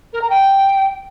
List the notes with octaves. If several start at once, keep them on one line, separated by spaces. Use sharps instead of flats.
A#4
A#5
G5